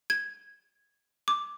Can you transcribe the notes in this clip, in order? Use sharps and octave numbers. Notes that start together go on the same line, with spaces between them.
G#6
D6